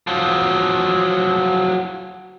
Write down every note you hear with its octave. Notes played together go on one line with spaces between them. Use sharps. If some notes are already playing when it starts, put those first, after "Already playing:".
F3 F#3